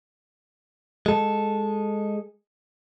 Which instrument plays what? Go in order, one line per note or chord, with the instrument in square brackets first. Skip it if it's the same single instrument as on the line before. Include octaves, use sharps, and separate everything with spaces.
[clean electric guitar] G#3 A4